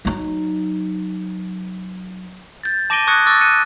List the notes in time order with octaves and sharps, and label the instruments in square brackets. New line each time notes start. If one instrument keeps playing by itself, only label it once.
[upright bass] F#3 D#4
[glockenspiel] G6 A6
A5 D6 A#6 D7 D#7 G7
C#6 D#6 F#6 G#6 A#6 C#7
C#6 D6 E6 A6 A#6
F#6 C#7 D#7